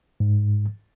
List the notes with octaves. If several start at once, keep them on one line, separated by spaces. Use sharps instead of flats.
G#2